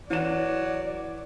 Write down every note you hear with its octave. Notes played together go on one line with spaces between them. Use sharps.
E3 F#3 D5 E7